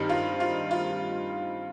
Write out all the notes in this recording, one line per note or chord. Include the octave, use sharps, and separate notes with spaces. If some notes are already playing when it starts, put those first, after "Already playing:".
Already playing: G2 D#3 G3 C4 D#4
F4
F4
F4